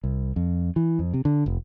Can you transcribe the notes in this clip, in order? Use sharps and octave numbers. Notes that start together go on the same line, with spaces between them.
C2
F2
E3
F2
C3
D3
F1